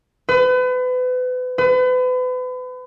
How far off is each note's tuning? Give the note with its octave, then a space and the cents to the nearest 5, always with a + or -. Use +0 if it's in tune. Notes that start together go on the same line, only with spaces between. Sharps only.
B4 +35
B4 +35